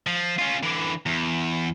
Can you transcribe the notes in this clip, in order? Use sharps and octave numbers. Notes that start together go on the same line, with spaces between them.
F3
C#4 F4
D3 E3
E2